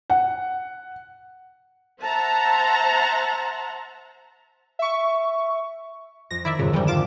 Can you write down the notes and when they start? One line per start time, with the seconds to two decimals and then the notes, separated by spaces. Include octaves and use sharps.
0.10 F#5
2.00 C5 E5 F#5 A5 A#5
4.79 E5 C#6
6.31 F2 A#6
6.45 D#3 E4 D5 E5
6.59 C2 F2 G#2 C#3
6.73 D2 G#2 D3 E3 G3
6.87 F4 D6 E7